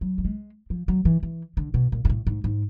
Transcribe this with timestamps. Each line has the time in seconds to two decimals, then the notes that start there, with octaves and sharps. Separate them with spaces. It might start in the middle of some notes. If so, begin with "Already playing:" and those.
0.01 F#3
0.18 A3
0.25 G#3
0.70 F3
0.88 F#3
1.05 E3
1.23 E3
1.57 D3
1.74 B2
1.92 A#2
2.05 G#2
2.10 A2
2.27 G#2
2.44 G#2